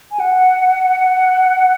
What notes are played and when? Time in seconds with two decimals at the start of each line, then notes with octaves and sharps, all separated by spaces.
0.12 G#5
0.20 F#5